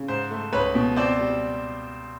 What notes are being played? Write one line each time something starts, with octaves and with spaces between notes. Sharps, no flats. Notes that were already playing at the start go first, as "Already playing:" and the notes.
Already playing: C#3
G#2 C5
A3
C#2 B4 C#5
B2
C4 C5 D5
G3